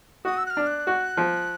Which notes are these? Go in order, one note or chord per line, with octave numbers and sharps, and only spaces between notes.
F#4 D#6
E6
F#6
F6
D4
F#6
F#4
F3